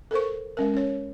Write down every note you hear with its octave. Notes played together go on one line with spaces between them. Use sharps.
A4 A#4 C5 C#6
G#3 C#4 A#4
C#4 C#5